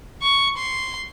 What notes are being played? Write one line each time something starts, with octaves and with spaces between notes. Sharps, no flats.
C#6
C6